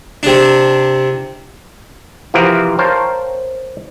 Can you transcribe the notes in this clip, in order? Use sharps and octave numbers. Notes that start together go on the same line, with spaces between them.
C3 D4
C3 E3 F3 C4 F#4 A#4
A#4 C5 C#5 F5 G5 A5